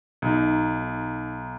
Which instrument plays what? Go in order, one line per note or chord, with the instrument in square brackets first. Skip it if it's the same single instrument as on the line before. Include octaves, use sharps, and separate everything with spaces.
[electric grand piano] B1 D#4